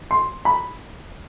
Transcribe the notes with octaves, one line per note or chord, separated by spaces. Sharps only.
C6
B5